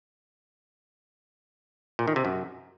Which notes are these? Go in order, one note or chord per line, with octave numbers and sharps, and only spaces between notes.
A#2
D#3
C3
F#2